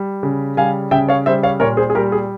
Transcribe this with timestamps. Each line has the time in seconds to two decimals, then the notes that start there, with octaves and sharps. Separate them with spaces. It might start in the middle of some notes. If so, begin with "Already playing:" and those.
Already playing: G3
0.23 C#3
0.57 G3 F5 G#5
0.91 C#3 E5 G5
1.09 C#5 F5
1.26 G3 C5 E5
1.43 C#5 F5
1.60 A#2 A#4 C#5
1.77 G#4 C5
1.90 G#4
1.95 G3 G4 A#4
2.12 G#4